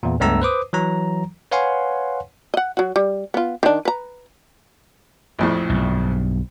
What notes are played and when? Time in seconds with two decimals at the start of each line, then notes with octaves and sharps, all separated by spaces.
0.03 E2 A#2
0.20 C#2 G2 A3 B3 A#5 E6
0.42 B4 C5 D6 D#6
0.73 E3 F#3 A#5
1.52 B4 C#5 F5 F#5 G#5 C6
2.54 D#5 F#5
2.77 F#3 F#4
2.96 G3
3.34 B3 F4
3.63 D#3 D4
3.85 B4 A#5
5.39 A#1 F2 A2
5.70 B1 G2